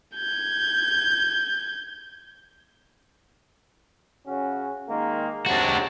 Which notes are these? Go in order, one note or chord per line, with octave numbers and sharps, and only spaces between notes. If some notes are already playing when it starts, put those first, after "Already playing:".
G6 G#6
C#3 C#4 F#4
D#3 G#3 A#3
G#2 C3 F#3 D4 F#4